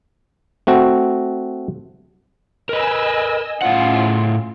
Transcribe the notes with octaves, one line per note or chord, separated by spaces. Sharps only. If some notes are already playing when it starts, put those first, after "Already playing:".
A3 C4 F#4
A#4 B4 D#5 G#5 E6
A2 C#4 E4 F4 F#5